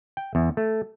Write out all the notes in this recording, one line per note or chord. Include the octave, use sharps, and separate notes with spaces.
G5
E2
A3